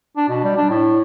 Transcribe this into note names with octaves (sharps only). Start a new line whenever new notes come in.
D4
B2
G3
D4
A2